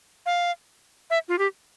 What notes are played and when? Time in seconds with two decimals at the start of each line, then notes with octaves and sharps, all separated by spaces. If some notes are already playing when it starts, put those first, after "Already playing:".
0.26 F5
1.10 E5
1.28 F4
1.39 G4